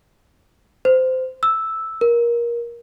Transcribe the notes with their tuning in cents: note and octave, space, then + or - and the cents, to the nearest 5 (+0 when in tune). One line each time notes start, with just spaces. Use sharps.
C5 -20
E6 -5
A#4 +20